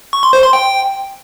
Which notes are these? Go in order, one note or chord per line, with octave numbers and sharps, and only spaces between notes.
C#6
C6
C5
C6
G5